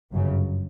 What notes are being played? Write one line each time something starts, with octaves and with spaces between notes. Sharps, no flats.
G1 F#2 C#3